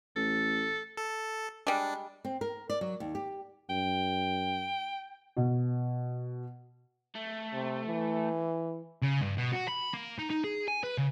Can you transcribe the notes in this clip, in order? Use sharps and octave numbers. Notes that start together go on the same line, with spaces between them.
A1 A4
A4
G3 G#3 D4
C4
A#4
D5
F#3
D#2
G4
F#2 G5
B2
A3
C3
E3
C#3
G2
B2
F#4
B5
A#3
D#4
D#4
G#4
G#5
B4
C#3